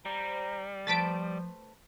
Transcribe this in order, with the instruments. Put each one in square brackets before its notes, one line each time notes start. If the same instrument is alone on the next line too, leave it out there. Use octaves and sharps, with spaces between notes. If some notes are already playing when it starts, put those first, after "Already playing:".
[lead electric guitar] G3 [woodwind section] C5 A#5
[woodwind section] F3 [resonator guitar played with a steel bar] A3 B4 C5 [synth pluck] A6 B6 D7